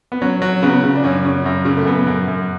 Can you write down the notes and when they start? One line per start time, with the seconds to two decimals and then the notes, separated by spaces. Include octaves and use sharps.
0.12 B3
0.22 F#3 C#4
0.42 F#3
0.63 C#3 B3
0.84 C#3
0.95 D4
1.04 F#2 C#4
1.25 C#3
1.46 F#2
1.65 C#3
1.77 A3
1.86 F#2 B3
2.07 F#2
2.28 F#2